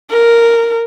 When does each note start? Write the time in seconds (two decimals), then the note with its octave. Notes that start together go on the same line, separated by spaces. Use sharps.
0.10 A#4